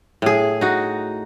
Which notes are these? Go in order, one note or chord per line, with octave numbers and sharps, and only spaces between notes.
A2 G#4
D#4 F#4